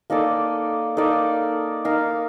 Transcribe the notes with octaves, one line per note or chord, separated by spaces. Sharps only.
A#3 D#4 A4 D5
A#3 D#4 A4 D5
D#4 A#4 F5